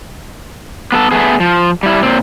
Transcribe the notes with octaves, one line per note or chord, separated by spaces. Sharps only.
B3 G#4 A4
A3 B3 G#4
F3
G3 E4
A#2 C4